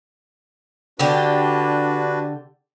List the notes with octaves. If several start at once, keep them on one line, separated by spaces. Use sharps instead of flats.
D3 D4 F#4 G4 B4